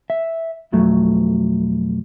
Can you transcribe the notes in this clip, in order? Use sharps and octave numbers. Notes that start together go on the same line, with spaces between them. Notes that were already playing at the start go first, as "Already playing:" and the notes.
E5
B1 F2 F#3 A3